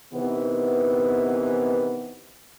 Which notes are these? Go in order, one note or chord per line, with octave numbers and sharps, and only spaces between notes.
C3 D#3 E3 B3